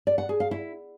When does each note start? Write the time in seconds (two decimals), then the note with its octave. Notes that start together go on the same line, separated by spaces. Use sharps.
0.07 D5
0.18 F#5
0.29 G#4
0.40 F5
0.51 E4